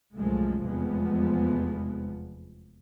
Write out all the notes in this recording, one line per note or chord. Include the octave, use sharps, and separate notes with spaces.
C2 F#2 A#2 F3 G#3 A3
F1 E2 C3 F3 G#3 B3